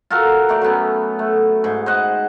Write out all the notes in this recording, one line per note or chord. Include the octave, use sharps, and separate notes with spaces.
F4 F#4 A4 A#4
A3 G4 D5
F#3 A3 B3 C#4
A3
G#2
C5 D#5 F#5